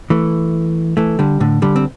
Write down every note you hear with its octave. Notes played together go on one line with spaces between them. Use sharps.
E3 A3
E3 A3
D3 G3
A2 D3
D3 G3
C4